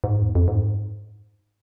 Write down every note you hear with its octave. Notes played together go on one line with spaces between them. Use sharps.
G#2
E2
F2
G#2